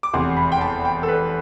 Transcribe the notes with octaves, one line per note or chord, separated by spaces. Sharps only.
D6
F1 E2 C3 C6
B5
G5
A5
G5
A4
B4